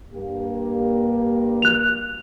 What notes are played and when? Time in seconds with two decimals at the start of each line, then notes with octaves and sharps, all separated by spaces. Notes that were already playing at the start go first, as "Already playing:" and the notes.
0.14 G2 A#3 G4
1.62 F#6 F7